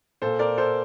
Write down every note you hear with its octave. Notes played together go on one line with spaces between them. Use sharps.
A#2 A4 C5
A#4 D5
A4 C5